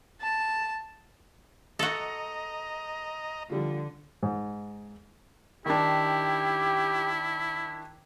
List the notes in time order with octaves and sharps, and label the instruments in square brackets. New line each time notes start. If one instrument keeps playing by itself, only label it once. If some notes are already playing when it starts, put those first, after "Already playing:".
[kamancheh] A5
[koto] F#4 A4 [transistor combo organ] D#5 A#5
[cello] D3 [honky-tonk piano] F3 G3 F4
[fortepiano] G#2
[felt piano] D#3 D4 [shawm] E4 [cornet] G4